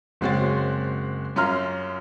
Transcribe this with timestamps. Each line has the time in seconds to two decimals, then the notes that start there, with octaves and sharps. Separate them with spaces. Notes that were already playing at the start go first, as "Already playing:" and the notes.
0.21 F#1 G#3 C4 F#4 C#5 A6
1.36 F#2 C#4 F4 A#5 C6 F6